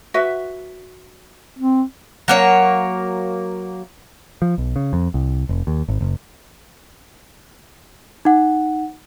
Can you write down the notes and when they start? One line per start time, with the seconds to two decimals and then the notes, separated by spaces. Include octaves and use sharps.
0.14 F#4 B4 E5
1.59 C4
2.28 F#3 A#3 C#5
4.42 F3
4.58 B1
4.76 C#3
4.93 F2
5.14 C2
5.49 F1
5.67 D#2
5.88 G#1
6.01 F#1
8.25 D#4 F#5